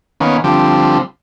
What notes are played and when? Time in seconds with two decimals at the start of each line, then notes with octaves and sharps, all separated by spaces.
0.20 D#3 A#3 B3 C#4
0.44 D3 F3 G3 C4